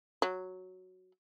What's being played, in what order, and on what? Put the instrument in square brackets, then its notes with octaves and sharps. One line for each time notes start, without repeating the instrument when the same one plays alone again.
[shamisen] F#3